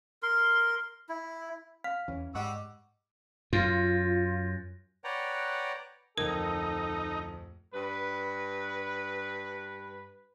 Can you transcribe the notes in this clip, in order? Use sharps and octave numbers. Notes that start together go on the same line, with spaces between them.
A#4 C6
E4
F5 F6
E2 E3 C#4
G#2 G3 D#5 F#5 C#6 D6 E6
F#2 F4
B4 C#5 D5 F#5 G5 A#5
D1 F2 D#4 A4 A#4
G2 B4